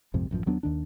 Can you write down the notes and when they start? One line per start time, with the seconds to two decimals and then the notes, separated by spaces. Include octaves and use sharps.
0.14 A#1 F2 G#2 C3
0.31 A1 F#2 B2 F3
0.46 D#2 F#3 B3 D4
0.63 D#2 D#3 D4